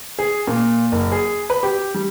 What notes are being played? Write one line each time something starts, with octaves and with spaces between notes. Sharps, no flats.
G#4
A#2
F#1
G#4
B4
G4
G3